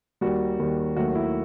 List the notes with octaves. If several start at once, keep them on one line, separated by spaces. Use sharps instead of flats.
D#2 D#3 G3 F#4
D#2 D#3 G3
D#2 D#3 F#3 A3 F#4
E4